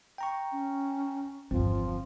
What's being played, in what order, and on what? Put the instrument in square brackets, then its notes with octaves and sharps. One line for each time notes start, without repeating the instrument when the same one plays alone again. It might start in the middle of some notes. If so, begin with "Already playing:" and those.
[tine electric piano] G5 A#5 C#6
[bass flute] C#4
[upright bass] G1 E2 [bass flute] F3 [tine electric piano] C4